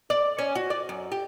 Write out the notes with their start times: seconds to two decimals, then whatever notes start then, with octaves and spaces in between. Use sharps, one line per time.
0.10 D5
0.38 C#4
0.55 F#4
0.70 D5
0.89 F#2
1.12 G4